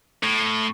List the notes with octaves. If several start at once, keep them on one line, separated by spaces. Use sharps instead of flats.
A2